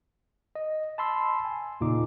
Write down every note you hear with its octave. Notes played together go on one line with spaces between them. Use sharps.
D#5
A5 B5 C6 E6
G#5
D#2 A#2 C#3 D#4 D6